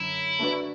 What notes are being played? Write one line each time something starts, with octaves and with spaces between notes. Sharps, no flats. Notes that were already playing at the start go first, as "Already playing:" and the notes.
Already playing: F#2 D3 E4
A3 D4 F#4 B4 D5